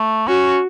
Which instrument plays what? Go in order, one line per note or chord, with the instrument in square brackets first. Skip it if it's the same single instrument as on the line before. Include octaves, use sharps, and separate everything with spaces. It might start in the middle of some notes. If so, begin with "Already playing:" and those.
Already playing: [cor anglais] A3
[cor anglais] C#4 [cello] F#4